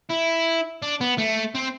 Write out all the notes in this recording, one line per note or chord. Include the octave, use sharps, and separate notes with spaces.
E4
D4
B3
A3
C4